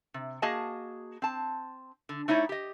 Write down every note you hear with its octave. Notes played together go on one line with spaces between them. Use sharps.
C3
A#3 F#4 G#4 D#5 A5
C4 A5
D3
A3 D#4 E4 C#5 D5
G4 D#5